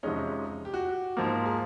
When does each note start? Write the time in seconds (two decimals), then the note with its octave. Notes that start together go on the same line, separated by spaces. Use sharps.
0.03 F2 C3 F3 G#3 C#4 D#4
0.65 G4
0.74 F#4
0.89 G4
1.17 G#2 F3 A#3
1.46 G#4